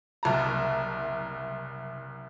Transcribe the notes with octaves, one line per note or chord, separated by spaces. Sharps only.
F#1 C2 A5 A#5